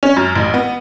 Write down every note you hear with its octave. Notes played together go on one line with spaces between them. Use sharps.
C#4
F#2
A1
B3